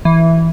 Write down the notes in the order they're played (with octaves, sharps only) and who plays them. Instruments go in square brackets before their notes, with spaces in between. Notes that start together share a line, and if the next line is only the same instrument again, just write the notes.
[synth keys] E3